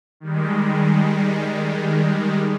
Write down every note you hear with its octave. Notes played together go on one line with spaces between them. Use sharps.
D#3 G3 G#3